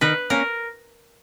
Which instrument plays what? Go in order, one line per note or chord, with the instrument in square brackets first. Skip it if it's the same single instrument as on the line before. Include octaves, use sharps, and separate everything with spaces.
[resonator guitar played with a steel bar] D#3 [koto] B4
[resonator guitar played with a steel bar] A#3 C#4 [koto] A#4